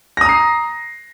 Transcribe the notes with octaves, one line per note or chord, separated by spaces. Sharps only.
A#5 D#6 A#6 C7